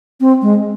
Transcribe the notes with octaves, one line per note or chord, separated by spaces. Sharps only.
C4
G#3